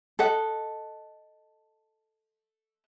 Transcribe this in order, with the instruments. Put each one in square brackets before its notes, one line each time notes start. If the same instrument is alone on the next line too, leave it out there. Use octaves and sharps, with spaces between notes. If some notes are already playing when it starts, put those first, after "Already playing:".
[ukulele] A4 D#5 F#5